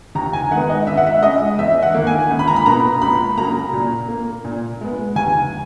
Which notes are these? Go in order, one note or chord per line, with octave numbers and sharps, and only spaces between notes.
D#2 A#5
G#5
D#3 G#3 B3 F#5
D#5
C#2 E5
F#5
E5
C#3 G#3 D#5
E2 E5
F#5
D#3 A#3
G#5
C#2
B5
A#5
B5
B2 A#3 A#5
C#2 B5
C#3 F#3 A#3 A#5
A#2
A#3
A#2
G#3 B3
D#2 G#5